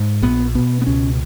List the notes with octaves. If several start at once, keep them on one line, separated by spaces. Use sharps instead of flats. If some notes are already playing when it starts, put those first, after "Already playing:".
Already playing: G#2
A#1 B3
B2 B3
B3
C#2 C#4